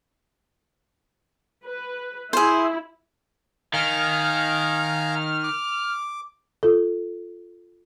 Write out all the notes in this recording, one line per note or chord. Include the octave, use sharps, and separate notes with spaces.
B4
E4 G#4 C5
D#3 F5 G#5 A#5 F6
D6
F4 A4